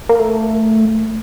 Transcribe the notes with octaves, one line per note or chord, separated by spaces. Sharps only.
A#3
A3